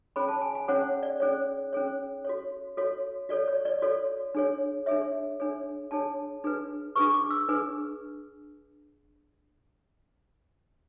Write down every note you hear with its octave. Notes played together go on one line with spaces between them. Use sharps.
C#4 G#4 C#5 B5
A5
G#5
G#5
C#4 G#4 C#5 F#5
D5
C#4 G#4 C#5
C#4 G#4 C#5
F#4 A4 C#5
F#4 A4 C#5
F#4 A4 C#5 D5
C#5
D5
F#4 A4 C#5
D4 G#4 C#5
D4 G#4 C#5 E5
D4 G#4 C#5
D4 G#4 C#5 A5
D4 G#4 B4
D4 G#4 B4 C#6
D6
E6
D4 G#4 B4